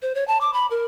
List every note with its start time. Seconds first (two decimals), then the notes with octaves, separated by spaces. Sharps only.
0.02 C5
0.15 C#5
0.28 A5
0.41 D6
0.53 B5
0.71 A#4